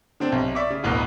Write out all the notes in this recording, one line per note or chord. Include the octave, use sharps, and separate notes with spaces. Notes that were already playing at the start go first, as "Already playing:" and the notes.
D3 C4 D4
B1 C3
D5 E5 C#6 D6
C#3
D1 A1 D2 B2 A#4